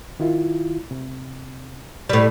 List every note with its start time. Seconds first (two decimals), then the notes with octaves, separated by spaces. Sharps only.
0.20 D#3 E4 F4
0.91 C3
2.09 A2 G3